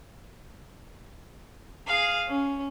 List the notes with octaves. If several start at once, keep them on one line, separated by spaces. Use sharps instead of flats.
G#4 F5
C#4